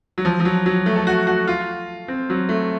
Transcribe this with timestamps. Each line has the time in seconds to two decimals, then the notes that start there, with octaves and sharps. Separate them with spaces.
0.18 F#3
0.25 F3
0.40 F3
0.45 F#3
0.66 F#3
0.86 A3
0.96 A4
1.07 F#4
1.27 F#4
1.47 F4
2.08 C4
2.30 F#3
2.49 A3